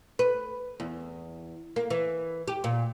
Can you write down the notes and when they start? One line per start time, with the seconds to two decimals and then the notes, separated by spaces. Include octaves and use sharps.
0.19 B4
0.80 E2
1.76 A#3
1.90 E3
2.48 G4
2.64 A#2